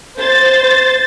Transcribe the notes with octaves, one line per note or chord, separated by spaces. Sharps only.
C5 A6